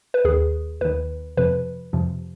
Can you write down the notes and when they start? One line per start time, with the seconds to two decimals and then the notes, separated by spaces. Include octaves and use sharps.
0.14 B4
0.25 D#2 D#3 G#4
0.81 D#2 D#3 B4
1.37 F2 C3 F3 B4
1.93 F2 C3 F3